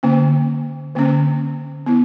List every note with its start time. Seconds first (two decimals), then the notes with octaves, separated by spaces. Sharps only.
0.03 D3 A#3 C#4
0.95 D3 A#3 C#4
1.86 B3 E4